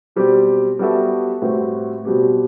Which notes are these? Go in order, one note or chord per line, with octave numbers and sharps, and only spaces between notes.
B2 G3 C4 G4
G3 B3 F#4 A4 E5
A2 G3 C4 F#4 B4
B2 G3 C4 G4